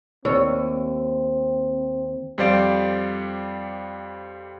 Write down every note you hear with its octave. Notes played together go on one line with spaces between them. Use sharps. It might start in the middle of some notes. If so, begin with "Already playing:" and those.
D#2 C4 C#5
F2 G3 C5 D5 F5 D7